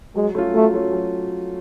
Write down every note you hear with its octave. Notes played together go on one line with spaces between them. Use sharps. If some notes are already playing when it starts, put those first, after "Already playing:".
F#3 G#3
A3 C#4 F4
F#3 A3
A3 C#4 F4
F#3